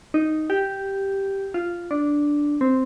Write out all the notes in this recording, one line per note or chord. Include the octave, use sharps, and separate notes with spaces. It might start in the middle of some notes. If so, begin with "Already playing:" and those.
D#4
G4
F4
D4
C4